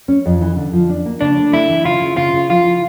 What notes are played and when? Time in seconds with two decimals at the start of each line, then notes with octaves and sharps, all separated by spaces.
0.08 C#4
0.25 F2
0.41 E3
0.56 D3
0.73 F3
0.89 D4
1.06 A#3
1.21 C#3 D4
1.37 A3
1.53 A3 E4
1.69 E3
1.85 C#3 F4
2.01 C#3
2.17 C#3 F4
2.33 C#3
2.49 F3 F4
2.66 E4